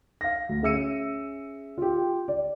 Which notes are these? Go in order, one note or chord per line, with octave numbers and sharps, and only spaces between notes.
F5 A#6
D2
C#4 G#4 E5 E6 C#7 D#7
F4 G4
D5